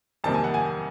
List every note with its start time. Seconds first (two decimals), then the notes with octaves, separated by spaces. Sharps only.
0.24 F2 C3 D#3 G3 C4 A5
0.34 G#5
0.44 F#5
0.54 G#5